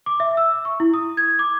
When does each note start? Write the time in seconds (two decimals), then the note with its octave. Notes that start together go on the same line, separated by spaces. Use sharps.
0.06 D6
0.20 E5
0.37 E6
0.65 C#6
0.80 E4
0.94 D#6
1.17 G#6
1.39 D6